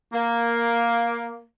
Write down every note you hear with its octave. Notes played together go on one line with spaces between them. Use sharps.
A#3